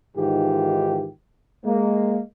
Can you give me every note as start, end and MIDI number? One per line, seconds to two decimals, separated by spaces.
0.17 1.07 44
0.17 1.07 51
0.17 1.07 52
0.17 1.07 65
0.17 1.07 67
1.65 2.21 56
1.65 2.21 58